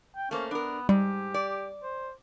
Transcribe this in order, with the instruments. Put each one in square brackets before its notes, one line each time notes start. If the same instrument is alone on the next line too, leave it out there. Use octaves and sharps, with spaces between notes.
[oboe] G5
[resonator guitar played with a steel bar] A3 A#3 C5 [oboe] C#4
[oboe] B3 [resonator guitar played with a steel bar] D4 A#4
[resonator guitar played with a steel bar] G#2 [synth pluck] G3 [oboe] G4
[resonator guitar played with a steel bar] D5
[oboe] C5